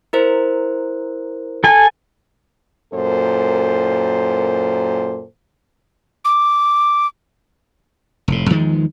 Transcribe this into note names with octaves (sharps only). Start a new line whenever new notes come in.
E4 A#4 C5
A4 G#5
F#2 A#2 A4 C5
D6
F1 A2
E2 D#3 F3 G#3